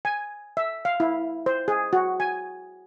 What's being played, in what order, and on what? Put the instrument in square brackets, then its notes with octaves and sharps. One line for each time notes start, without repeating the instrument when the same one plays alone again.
[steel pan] G#5
E5
F5
E4
C5
G#4
F#4
G#5